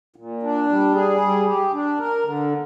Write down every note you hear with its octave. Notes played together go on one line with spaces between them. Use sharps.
A#2
D4
G3
G#4
G3
G4
D4
A#4
D3